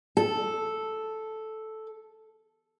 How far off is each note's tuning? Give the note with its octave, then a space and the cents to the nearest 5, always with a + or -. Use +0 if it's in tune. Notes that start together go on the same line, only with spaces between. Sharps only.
A4 -5